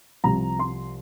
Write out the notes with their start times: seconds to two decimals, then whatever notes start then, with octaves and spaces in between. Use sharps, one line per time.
0.24 C2 C3 F3 A#5
0.59 C6